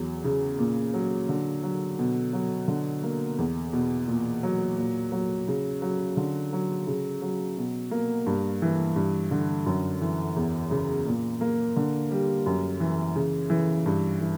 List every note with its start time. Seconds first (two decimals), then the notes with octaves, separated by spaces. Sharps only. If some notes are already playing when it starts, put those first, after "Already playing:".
Already playing: E2 F#3
0.24 C#3
0.59 A#2
0.94 F#3
1.29 D3
1.63 F#3
1.99 B2
2.33 F#3
2.68 D3
3.03 A#3
3.38 E2
3.73 B2
4.08 A#2
4.43 F#3
4.77 A#2
5.12 F#3
5.48 C#3
5.82 F#3
6.17 D3
6.53 F#3
6.87 C#3
7.22 F#3
7.57 B2
7.91 A#3
8.27 G2
8.62 E3
8.96 G2
9.31 D3
9.66 F#2
10.01 E3
10.36 E2
10.71 C#3
11.06 A#2
11.41 A#3
11.76 D3
12.11 G3
12.46 F#2
12.80 E3
13.16 C#3
13.50 E3
13.86 G2
14.20 E3